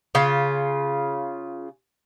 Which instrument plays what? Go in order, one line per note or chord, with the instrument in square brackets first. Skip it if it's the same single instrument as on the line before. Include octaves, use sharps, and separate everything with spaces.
[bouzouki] C#3 F4